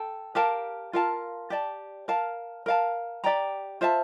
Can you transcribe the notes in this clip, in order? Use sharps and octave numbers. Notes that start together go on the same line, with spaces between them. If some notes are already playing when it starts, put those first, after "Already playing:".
Already playing: A4 G5
G4 A#4 F5 A5
F4 A#4 F5 A5
G4 D5 A5
A#4 F5 A5
A#4 F5 A5
G4 D5 G5 A#5
F4 C5 E5 A5